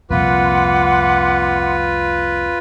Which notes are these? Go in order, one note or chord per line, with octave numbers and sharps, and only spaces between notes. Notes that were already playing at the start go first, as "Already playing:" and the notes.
C2 F2 A#2 F4 B4 F#5 C6 D6